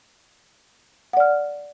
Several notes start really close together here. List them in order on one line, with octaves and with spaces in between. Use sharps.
F#5 D5 F6